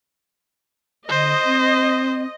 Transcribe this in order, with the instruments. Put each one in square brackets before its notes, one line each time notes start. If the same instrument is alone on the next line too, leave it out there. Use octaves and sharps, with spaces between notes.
[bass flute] D3 [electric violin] C5 [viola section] D#5
[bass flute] C4